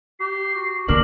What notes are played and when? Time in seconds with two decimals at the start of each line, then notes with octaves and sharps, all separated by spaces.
0.20 G4 C7
0.56 F#4
0.88 D#2 D3 D4 A#4 F#7